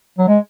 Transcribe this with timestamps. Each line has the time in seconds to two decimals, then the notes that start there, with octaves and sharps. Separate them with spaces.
0.18 F#3
0.28 G#3